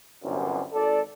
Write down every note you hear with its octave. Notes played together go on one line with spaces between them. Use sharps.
G1 C2 F#2
G#1 A4 D5